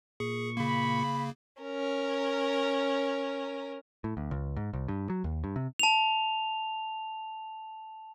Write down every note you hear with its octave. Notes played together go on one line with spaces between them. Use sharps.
A#2 G#4 C#6
C#3 A#3 B5
C#4 A#4
A2
D2
C#2
G#2
C2
G2
F#3
D#2
G2
C3
A5 F7